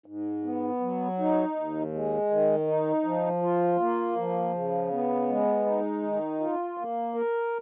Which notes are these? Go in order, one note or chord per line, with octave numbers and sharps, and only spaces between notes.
G#2
B3
F#3
D#4
D#2
G#3
D#3
D#4
F3
F4
A#3
F3
C#3
B3
G#3
D#4
D#3
F4
A#3
A#4